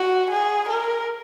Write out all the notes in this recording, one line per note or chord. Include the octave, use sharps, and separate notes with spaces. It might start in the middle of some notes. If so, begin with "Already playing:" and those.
Already playing: F#4
G#4
A#4